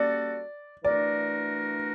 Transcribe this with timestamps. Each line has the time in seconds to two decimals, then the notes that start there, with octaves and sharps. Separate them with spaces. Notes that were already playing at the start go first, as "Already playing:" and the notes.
Already playing: G3 A#3 C#4 F#4 A4 D5
0.84 E3 A3 D4 F#4 A#4 D5